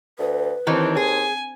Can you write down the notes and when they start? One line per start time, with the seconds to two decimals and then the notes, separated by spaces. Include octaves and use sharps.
0.19 D2 B4
0.67 D#2 D#3 E3 C4 D4 D#4
0.97 G#4 G#5